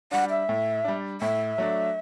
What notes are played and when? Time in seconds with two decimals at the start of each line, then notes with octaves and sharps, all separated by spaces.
0.11 G3 D4 F#5
0.30 E5
0.49 A2
0.84 G3 D4
1.21 A2 E5
1.58 F#3 A3 D4